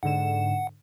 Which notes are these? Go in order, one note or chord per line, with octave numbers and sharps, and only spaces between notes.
G#2 D3 F#5 E7